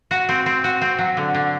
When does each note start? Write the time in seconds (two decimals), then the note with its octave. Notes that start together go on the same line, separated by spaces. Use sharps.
0.11 F#4
0.29 C4
0.46 C4
0.64 F#4
0.81 C4
0.99 F#3
1.17 D3
1.35 D3